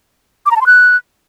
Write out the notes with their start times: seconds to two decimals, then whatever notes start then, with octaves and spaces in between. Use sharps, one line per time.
0.46 D6
0.51 A#5
0.56 A5
0.61 C6
0.66 F#6